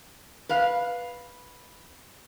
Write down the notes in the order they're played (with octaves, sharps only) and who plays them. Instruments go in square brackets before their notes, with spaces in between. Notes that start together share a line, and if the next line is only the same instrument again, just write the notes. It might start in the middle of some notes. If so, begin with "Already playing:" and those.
[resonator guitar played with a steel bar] B4 F5